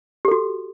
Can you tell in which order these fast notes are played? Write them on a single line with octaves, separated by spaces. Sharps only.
G4 A4 F#4